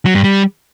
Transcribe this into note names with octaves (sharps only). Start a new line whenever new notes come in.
F#3
G2
G3